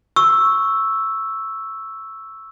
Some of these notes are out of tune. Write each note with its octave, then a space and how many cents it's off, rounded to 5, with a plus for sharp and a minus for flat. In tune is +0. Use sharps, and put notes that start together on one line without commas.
C#6 +0 E6 +0